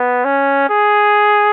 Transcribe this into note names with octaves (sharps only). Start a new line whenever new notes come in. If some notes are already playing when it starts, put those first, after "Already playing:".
Already playing: B3
C#4
G#4